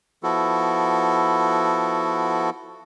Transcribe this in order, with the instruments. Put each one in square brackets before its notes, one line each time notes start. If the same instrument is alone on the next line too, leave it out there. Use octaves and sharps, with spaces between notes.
[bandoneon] F3 B3 E4 F#4 A4